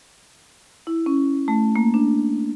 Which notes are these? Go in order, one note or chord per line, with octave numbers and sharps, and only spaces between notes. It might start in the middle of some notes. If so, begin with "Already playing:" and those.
E4
C#4
A3
A#3
D4